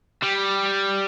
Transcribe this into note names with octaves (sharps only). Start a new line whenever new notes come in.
G3